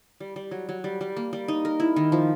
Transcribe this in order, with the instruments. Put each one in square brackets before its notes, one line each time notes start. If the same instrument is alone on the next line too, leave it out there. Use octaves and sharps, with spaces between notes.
[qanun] G3
G3
F#3
F#3
G3
G3
A#3
G3
D#4
A#4
E4
D#3
F3